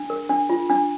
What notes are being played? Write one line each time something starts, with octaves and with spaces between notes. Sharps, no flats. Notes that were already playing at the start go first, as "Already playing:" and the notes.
Already playing: D4
A#4
D4
F4
D4